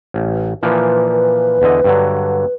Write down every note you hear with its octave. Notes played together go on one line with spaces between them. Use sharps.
A1
A#2 E3 F3 B4
E2 D3 D#5
G2 D3 F#3